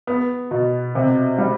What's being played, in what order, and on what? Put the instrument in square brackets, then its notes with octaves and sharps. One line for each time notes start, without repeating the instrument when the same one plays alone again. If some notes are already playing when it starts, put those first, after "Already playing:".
[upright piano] B3
B2
C3
G3